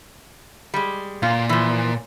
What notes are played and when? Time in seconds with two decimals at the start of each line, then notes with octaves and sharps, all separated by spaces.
0.74 G3 G#3
1.22 A#2 F4
1.49 E3 F3